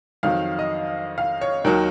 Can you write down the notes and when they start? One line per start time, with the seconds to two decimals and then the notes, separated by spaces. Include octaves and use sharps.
0.23 F2 D#3 F#3 F5
0.59 D#5
1.18 F5
1.41 C#5
1.64 D#2 D#3 F#3 A#4